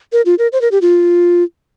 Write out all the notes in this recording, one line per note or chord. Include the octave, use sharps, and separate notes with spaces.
A#4
F4
A#4
C5
A#4
G4
F4